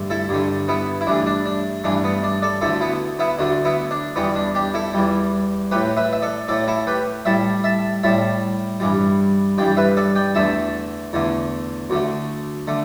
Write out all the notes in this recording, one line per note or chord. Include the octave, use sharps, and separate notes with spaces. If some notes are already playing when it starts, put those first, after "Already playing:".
Already playing: G2 D3 A3
E4 A4
G2 D3 A3
B3 E4
E4
G2 E3 A3 D4
D4
D4
G2 E3 A3 D4
B3
D4
A4 D5
D2 D3 A3 E4 A4
B3 E4
B3 E4
D2 D3 A3 D4
B3 E4
D4
E2 E3 G3 B3
D4
D4 G4
E4 A4
E2 E3 G3
A2 A3 G4 B4
B4 E5
E5
A4 D5
A2 A3 A4 D5
E4 A4
G4 B4
A2 G3 E5 A5
E5 A5
A2 G3 E5 A5
G2 E3 G3
G2 E3 G3 D5 G5
B4 E5
A4 D5
D5 G5
E2 D3 A3 E5 A5
E2 D3 A3
D2 D3 A3
D3 A3